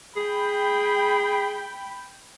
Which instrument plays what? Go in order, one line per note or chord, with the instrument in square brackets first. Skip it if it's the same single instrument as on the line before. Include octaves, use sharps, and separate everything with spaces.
[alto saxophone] G#4 [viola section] G5 B5